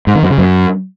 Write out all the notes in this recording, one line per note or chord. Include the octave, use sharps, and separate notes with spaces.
G#2
D#3
F#2
C#3
F#2